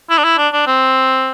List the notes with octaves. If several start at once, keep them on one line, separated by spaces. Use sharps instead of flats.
E4
D4
E4
D4
D4
C4